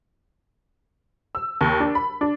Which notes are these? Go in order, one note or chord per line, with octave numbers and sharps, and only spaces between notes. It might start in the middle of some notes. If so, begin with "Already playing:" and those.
E6
D#2
D4
B5
D4